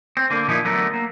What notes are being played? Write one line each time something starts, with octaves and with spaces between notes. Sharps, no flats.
C4
D3 A#3
A#2 F3 D#4 E4
D3 F#3 A3 B3 A4 A#4
A#3